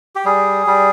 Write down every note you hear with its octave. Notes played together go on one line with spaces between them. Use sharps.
G4
G3 G#4
G3